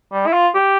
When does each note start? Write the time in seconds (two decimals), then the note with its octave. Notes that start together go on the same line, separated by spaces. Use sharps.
0.12 G3
0.26 E4
0.33 F4
0.55 G4